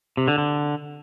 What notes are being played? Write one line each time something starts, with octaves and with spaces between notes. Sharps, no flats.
C3
D3
D3